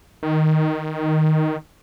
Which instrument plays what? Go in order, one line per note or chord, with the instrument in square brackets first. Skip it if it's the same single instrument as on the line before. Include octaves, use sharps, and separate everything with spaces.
[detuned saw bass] D#3